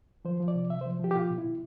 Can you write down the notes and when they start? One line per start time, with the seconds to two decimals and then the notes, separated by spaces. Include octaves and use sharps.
0.25 F3 C5
0.40 F3
0.48 D5
0.55 C3
0.70 C3 E5
0.81 C5
0.86 F3
0.99 F3 G4
1.11 G4
1.15 B2 F4
1.30 B2
1.38 E4
1.45 B2